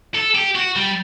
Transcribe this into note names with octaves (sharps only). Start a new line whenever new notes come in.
A4
G4
F#4
G3